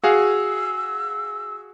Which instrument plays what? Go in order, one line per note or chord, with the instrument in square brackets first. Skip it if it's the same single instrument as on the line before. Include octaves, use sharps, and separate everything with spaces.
[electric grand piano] F#4 G#4 F5 [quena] E6